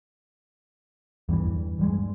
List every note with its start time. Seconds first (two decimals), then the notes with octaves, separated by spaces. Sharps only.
1.29 E2 G2 E3
1.79 E2 G2 G#3